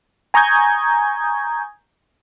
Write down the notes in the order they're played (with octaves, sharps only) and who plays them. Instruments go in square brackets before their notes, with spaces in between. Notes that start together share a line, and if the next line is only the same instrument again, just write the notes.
[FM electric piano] G#5 A#5 C#6 D#6 G6 G#6